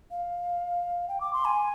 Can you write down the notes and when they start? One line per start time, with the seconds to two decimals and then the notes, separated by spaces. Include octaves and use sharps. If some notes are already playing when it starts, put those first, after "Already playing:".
0.11 F5
1.08 G5
1.21 D6
1.33 C6
1.45 G#5